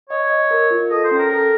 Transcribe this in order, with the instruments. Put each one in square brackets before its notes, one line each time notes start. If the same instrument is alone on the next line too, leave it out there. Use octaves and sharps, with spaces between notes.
[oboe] C#5 [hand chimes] D#5
[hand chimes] D#5
A#4
F4
[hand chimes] A4 [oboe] D#5
[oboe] C5
[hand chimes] C#4
[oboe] A#4
[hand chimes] A4 [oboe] A#4